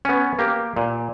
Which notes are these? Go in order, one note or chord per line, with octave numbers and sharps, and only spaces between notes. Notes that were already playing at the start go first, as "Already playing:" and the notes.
B3 C#4
A#3 G4
A#2